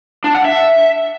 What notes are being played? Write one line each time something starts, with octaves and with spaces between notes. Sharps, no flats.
D4
F#5
E5